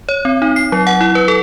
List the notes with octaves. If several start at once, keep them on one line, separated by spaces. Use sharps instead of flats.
C#5
C4
D#4
C7
F#3
F#5
E4
B4
A4